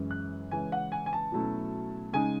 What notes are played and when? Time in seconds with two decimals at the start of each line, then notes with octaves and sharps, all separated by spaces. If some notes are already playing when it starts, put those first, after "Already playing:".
Already playing: F#2 E3 G#3 C#4
0.11 F#6
0.51 C#3 E3 G#3 C#4 G#5
0.72 F#5
0.92 G#5
1.06 G#5
1.13 A5
1.32 B2 F#3 A3 C#4 E4
2.13 C#3 G#3 D#4 G#5